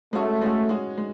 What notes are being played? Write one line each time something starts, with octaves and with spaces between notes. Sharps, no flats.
G#3 A3 C#4 F#4
G#3 C#4 F#4
G#3 C#4 F#4
G#3